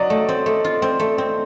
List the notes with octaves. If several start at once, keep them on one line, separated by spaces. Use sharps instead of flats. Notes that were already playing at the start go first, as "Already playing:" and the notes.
Already playing: F#3 D5 D#5
A3
C4
A3
F4
C4
A3
C4